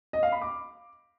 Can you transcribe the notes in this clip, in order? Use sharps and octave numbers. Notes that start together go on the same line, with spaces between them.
D#5
F5
B5
D6